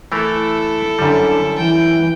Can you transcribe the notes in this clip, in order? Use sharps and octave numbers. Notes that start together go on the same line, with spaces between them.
E3 A3 E4 A4 A#4
F#2 D3 G3
E3 G5